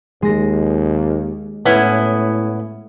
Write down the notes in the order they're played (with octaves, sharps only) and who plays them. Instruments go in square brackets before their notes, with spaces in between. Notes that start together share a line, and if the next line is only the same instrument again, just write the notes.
[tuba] D#2 [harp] G#3 A#6
[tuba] A2 [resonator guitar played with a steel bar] B3 C#4 E4